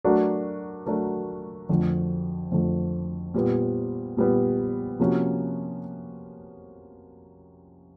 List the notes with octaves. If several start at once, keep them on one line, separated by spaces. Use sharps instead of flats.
F#3 A3 D4 F#4 A#4
F#3 A3 D4 F#4 A#4
F2 D3 F3 A3
F2 D3 F3 A3
A#2 G3 B3
A#2 G3 B3
C3 F3 A#3 C#4 F#4